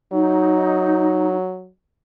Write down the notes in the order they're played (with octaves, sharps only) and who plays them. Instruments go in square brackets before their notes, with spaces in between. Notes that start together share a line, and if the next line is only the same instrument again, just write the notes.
[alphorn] F#3 [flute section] D#4